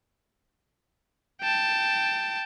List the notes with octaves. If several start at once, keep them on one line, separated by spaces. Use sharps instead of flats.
G5 A5